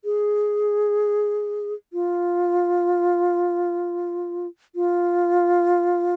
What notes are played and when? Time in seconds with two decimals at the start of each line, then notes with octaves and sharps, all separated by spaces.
0.05 G#4
1.93 F4
4.75 F4